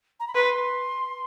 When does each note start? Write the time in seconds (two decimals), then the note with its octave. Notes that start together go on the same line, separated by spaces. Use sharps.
0.20 A#5
0.28 B5
0.34 B4 C6